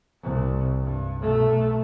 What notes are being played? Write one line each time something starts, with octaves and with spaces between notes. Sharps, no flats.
C2
G2
B1 A3